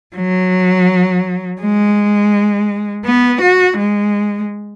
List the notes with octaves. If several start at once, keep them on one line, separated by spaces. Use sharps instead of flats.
F#3
G#3
B3
F#4
G#3